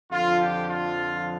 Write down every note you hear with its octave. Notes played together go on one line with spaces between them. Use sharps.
F2 D3 F3 F4
G4
F4